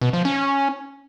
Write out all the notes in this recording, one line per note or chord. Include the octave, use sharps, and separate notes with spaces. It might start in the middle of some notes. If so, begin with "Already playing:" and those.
B2
F3
C#4